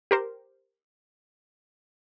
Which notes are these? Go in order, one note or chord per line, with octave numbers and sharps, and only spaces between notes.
G4 A#4 C5